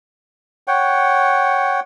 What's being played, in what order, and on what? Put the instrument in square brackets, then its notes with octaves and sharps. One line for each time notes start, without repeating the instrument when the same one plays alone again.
[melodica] C#5 F#5 G5